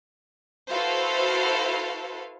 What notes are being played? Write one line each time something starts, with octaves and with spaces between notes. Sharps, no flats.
E4 F#4 A4 B4 C5 F5